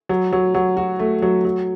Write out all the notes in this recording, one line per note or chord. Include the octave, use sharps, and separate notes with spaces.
F#3
F#3
F#3
F#4
A3
F#3
F#3